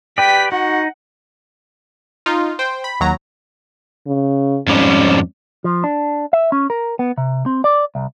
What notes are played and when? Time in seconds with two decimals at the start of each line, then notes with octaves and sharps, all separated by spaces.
0.18 G4 B4 D5 G5 B6
0.52 D#4 F#4 F#5
2.26 D#4 F4
2.59 C5 G5
2.84 B5
3.00 D#2 F#3 A#5
4.07 C#3
4.67 F2 G#2 G3 C#4
5.64 F3
5.84 D4
6.33 E5
6.52 C#4
6.70 A#4
6.99 B3
7.18 C3
7.46 C4
7.64 D5
7.95 C2